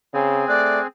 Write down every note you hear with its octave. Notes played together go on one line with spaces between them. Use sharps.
C#3 C4 G#4
A3 D5 F#6